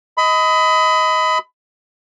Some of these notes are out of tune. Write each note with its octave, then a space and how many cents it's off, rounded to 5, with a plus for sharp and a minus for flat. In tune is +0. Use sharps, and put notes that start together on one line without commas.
D#5 +20 B5 +25